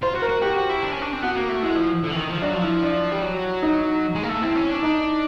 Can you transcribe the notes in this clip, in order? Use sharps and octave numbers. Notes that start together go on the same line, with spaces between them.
F4 C5
F#4
A#4
F#4
F#4 G4
F#4
E4
D4
C#4
D4
C4
B3 F#4
A#3
A3
G#3 E4
F3
D3
E3
D#3
F3
F#3 D4
F3
E4
D4
G3
F#3
D#4
G#3
A#3
A3
C4 E4
C#4
D4
D#4